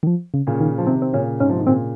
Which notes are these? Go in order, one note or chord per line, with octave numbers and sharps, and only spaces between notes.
D#3
F3
C#3
A#2 C#3
D#3
F3
C3 D#3 C4
C4
A#2 C#3 C#4
G#2 C3 C#4
F3
D#3
A#2 C#3 C4